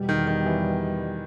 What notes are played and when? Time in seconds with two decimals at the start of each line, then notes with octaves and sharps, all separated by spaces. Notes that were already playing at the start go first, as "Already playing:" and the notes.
Already playing: E2 B2 G3
0.09 D#3
0.27 D#3
0.46 E3